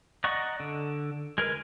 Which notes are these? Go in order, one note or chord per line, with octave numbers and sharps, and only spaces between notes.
D5 D#5 F#5 A#5 C#6
D3
G#3 A#4 B4